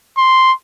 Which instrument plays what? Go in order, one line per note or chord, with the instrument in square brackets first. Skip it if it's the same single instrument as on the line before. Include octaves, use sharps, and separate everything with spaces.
[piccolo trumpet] C6